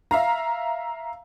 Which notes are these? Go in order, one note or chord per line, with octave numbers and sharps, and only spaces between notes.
E5 F5 A#5